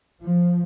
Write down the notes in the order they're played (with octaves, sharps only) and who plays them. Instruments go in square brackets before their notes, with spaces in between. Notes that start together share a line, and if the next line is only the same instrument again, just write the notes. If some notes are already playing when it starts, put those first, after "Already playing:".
[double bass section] F3